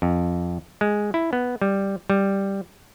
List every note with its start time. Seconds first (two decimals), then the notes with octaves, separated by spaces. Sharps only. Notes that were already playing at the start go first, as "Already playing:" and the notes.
0.02 F2
0.81 G#3
1.14 E4
1.33 B3
1.62 G3
2.10 G3